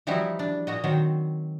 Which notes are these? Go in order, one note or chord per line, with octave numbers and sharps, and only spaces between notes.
E3 F3 G3 D#4 E4 F#4
D4
A#2 F#4 D#5
D#3 F#3 C4